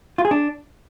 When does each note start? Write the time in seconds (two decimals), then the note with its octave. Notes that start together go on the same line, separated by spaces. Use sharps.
0.18 F4
0.25 G#4
0.31 D4